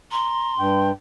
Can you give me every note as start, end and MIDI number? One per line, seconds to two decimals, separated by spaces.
0.11 0.57 82
0.11 0.88 84
0.58 0.91 43
0.58 0.90 79